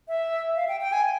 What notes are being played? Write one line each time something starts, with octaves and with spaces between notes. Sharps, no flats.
E5
F5
G5
G5
G#5